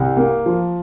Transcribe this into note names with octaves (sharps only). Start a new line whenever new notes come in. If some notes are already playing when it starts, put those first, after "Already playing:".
Already playing: C2
A#3
F3